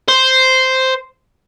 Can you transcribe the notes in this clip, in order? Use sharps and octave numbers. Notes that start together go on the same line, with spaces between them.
C5